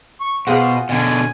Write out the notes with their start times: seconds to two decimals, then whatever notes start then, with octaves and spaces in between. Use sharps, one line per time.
0.20 C#6
0.47 B2 F4 G#4 C5 F#5
0.89 B2 D3 G#5